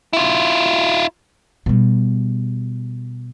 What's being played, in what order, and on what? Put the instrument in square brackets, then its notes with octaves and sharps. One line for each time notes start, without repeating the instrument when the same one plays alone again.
[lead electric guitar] E4 F4
[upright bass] B2 G3